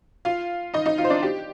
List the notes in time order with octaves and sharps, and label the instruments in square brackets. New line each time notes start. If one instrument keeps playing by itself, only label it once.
[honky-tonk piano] F4 F5
D#4 D#5
D#4 D#5
F4 F5
C5
D4 D5
G4